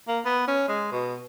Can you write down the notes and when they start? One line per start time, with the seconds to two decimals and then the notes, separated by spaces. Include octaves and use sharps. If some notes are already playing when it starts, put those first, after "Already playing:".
0.08 A#3
0.25 B3
0.48 C#4
0.69 G#3
0.92 B2